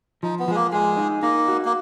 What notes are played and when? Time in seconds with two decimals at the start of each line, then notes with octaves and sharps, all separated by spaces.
0.23 F3 D#4
0.39 B3
0.48 F3 G#3
0.56 A#3
0.72 G#3 G#4
0.97 D#4
1.23 A#3 D#4
1.48 F#4
1.65 A#3